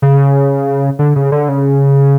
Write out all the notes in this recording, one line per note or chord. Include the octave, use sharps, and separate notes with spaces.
C#3
D3
C#3
D3
C#3